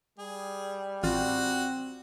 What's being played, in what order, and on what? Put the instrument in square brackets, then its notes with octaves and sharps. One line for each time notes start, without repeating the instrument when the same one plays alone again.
[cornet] G3 [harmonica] G#4
[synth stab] A1 F4 [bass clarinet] C4 [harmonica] F#4